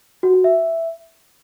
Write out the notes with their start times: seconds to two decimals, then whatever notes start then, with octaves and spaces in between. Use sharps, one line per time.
0.23 F#4
0.34 F#4
0.44 E5